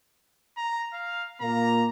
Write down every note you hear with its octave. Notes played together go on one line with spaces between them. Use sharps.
A#5
F5
A#2 A#3 A#5